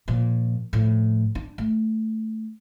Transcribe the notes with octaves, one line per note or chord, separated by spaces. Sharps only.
A#2 F3
A2 F3
D4
A3